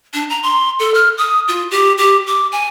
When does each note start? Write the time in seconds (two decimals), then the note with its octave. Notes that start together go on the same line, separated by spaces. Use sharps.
0.14 D4
0.30 A#5
0.43 C6
0.79 A4
0.94 F6
1.18 D#6
1.48 F4
1.71 G4
1.98 G4
2.27 D6
2.52 G#5